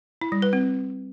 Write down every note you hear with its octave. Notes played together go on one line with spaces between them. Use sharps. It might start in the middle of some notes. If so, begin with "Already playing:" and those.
E4
G3
B4
C4